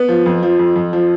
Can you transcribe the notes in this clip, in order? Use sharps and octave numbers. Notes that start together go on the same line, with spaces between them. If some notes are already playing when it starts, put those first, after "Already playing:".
Already playing: B3
F3
F2
F3
F2
F2
F3